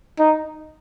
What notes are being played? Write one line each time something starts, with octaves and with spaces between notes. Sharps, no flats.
D#4